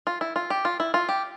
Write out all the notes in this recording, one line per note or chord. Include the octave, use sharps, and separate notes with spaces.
F4
E4
F4
G4
F4
E4
F4
G4